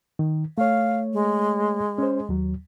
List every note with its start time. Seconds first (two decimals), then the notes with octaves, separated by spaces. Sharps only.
0.19 D#3
0.58 A3 C#5 F5
1.13 G#3
1.98 C#4 C5
2.29 D#2 F#3